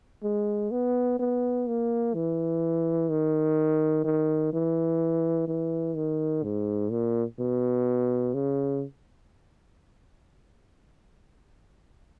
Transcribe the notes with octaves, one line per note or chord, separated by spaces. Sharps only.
G#3
B3
B3
A#3
E3
D#3
D#3
E3
E3
D#3
G#2
A#2
B2
C#3